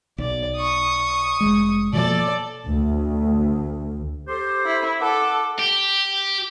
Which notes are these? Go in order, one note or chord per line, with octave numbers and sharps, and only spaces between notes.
B1 D5
C#6 D#6
F1 G#3
B2 F3 A#3 A4 D5
D2
G4 A4 C5
E4
A4 F#5 D6
G4